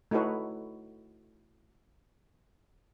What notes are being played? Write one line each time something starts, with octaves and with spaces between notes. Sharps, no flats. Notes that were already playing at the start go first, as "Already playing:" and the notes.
A3 D#4 E4 F#4 B4 C#5